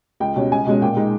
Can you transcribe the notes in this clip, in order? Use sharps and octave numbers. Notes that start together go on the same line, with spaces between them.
C#2 G5
B2 G3 C#4
C#2 G#5
B2 G#3 C#4
A#2 G5
G#3 D#4